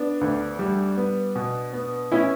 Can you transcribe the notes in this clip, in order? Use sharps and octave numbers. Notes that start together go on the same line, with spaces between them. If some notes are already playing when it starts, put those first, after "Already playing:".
Already playing: B3 D4
D2
G3
B3
B2
B3
B3 C#4 E4